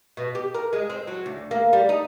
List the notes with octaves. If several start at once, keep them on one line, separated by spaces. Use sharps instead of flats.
B2
G4
A#4
G#3
C4
F#3
D2
A#3
G3
D#4